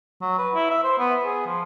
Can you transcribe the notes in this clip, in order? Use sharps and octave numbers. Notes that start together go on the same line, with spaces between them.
F#3
B4
E4
E5
C5
B3
G#4
F3